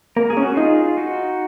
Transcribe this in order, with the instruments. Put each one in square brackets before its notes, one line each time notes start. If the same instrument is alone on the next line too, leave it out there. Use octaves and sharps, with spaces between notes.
[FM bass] A#3 [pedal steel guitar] A#4
[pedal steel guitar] G#4
[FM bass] C#4
[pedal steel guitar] F#4
[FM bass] D#4 [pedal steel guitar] F4 G#4
[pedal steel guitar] D#4 F#4